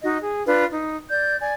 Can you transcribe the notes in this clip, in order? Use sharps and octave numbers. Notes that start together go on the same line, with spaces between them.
D#4 F#4 D#5
G#4
D4 F4 B4
D#4
D5 G6
D5 G#5